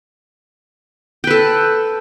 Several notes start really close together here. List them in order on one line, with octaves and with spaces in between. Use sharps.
G5 B4 A4